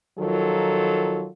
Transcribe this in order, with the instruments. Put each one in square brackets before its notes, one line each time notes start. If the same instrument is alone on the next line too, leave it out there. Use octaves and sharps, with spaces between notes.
[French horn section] D#3 F3 F#3 F4 A4